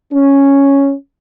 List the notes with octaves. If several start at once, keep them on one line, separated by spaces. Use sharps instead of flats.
C#4